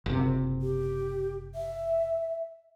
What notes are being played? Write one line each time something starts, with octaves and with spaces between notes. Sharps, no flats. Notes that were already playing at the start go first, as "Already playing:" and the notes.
F#1 C3
G4
E5